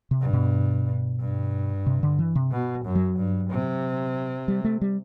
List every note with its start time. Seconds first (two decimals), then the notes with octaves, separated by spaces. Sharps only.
0.11 C3
0.21 G2
0.33 B2
1.20 G2
1.86 C3
2.03 D3
2.19 E3
2.35 C3
2.52 B2
2.85 F#2
2.95 F#3
3.18 G2
3.51 C3
4.48 G3
4.64 A3
4.81 G3